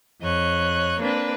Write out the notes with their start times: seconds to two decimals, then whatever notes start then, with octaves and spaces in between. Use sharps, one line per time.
0.22 F2 C#5 D#5 F#6
0.99 A#3 C4 D4 B4